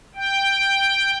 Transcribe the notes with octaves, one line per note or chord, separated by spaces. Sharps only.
G5